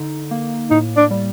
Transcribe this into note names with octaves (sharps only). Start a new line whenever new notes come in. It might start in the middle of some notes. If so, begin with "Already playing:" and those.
Already playing: D3 D#4
A#3
A2 D#4
D4
G3